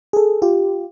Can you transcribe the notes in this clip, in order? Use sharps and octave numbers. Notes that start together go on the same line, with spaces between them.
G#4 A4
F4 G4